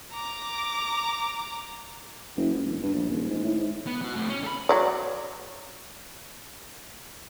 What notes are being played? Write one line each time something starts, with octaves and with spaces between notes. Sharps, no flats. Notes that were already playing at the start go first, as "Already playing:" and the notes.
A#5 D6
F#1
C#2
E1
G2
A#1
D#1
G#2
A2
G#2
B3
B3 F#4
A3 C4
C#4
A4 B5
F#3 C#5 D5